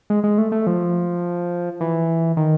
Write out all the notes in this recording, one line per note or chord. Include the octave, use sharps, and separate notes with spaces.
G#3
G#3
A3
A3
F3
E3
D#3